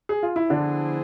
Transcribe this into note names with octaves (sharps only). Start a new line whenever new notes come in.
G#4
F4
E4
D3 F3 B3 D4 E4 G#4 C5